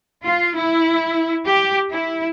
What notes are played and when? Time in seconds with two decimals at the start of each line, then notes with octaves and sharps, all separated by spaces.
0.24 F4
0.56 E4
1.47 G4
1.91 E4